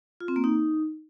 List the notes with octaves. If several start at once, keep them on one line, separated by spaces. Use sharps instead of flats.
F4
C4
A#3
D#4